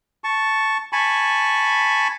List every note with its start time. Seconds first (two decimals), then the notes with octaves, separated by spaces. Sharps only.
0.24 A5 C#6
0.93 G#5 A5 B5 C#6